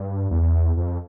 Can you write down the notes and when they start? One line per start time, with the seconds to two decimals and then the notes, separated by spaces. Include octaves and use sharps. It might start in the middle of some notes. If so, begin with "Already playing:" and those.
Already playing: G2
0.31 E2
0.77 F2